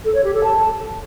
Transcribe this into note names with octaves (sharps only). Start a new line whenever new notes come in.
A4
C#5
G4
A4
A5